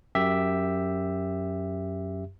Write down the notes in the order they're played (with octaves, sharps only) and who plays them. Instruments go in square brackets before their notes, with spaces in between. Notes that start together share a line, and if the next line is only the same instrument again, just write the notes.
[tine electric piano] F#2 G4 E5